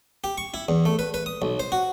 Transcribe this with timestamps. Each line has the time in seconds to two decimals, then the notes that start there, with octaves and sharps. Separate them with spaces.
0.24 G4
0.38 C#6
0.54 E4
0.69 E2
0.85 A3
0.99 B4
1.14 B4
1.26 D#6
1.42 B1
1.60 C5
1.72 F#4